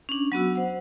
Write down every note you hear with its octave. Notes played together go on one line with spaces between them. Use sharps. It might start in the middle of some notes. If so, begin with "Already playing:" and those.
C#4 D4
F#3 B3 F#4 E6
C5 F#5